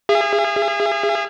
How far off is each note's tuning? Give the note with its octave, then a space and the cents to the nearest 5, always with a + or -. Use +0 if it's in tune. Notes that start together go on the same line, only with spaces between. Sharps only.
G#4 -25 E5 +40